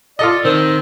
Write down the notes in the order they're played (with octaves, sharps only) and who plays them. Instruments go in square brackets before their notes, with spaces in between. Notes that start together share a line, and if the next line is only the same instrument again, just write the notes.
[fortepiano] F4 A4 D#5 [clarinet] D5
[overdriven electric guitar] D#3 [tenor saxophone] C4 [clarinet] A#4